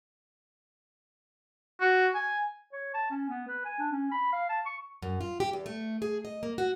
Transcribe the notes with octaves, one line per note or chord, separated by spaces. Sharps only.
F#4
G#5
C#5
A5
C#4
B3
B4
G#5
D4
C#4
B5
F5
A5
C#6
F#2
F4
G4
E2
A3
G#4
D#5
A#3
F#4